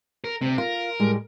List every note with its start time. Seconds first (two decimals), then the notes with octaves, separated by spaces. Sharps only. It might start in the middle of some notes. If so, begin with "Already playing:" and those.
0.24 A#4
0.41 D2 C3 C4
0.58 F4 A#4
1.00 A2 G3 G#3